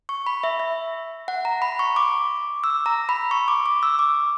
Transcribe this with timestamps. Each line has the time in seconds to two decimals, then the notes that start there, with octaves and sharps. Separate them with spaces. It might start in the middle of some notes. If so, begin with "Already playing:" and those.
0.09 C#6
0.26 B5
0.43 E5
0.60 E5
1.28 F#5
1.45 A#5
1.62 B5
1.79 C#6
1.96 D6
2.64 E6
2.86 A#5
3.09 B5
3.31 C#6
3.48 D6
3.66 D6
3.83 E6
3.99 D6